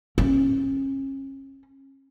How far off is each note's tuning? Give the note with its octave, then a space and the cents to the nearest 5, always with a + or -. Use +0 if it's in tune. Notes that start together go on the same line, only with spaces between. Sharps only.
C#4 -35